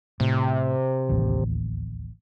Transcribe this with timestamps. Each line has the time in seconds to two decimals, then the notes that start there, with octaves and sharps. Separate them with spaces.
0.20 A2 C3
1.09 D1 A1 D#2